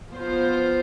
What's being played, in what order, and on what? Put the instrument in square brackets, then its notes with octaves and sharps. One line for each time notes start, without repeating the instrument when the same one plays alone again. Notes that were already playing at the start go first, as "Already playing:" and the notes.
[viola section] F3 B3 F4 C5